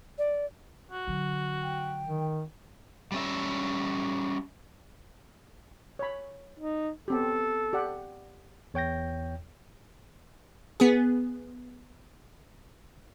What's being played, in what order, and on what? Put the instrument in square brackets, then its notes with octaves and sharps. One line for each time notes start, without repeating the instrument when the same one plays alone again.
[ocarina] D5
[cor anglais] F#4
[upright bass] D3 F#3
[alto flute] G5
[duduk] D#3
[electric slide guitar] G3 C#4 E5
[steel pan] C#5 B5
[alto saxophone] D#4
[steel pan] B3 C4 G4 [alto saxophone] A4
[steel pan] G4 D5 F#5
[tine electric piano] E2 C#5 G5 G6 A#6
[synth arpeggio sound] B3 G#4